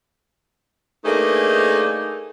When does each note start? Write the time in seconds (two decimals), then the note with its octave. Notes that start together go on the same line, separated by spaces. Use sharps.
1.04 A3 A#3 D4 D#4 G#4 B4